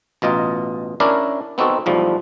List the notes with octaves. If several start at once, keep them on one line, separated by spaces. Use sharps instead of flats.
A1 B2 F4 D#5 A#5
C#4 D4 E4 A#4 D5
B3 C4 D#4 F#4 A4
B1 E2 F3 G3 A3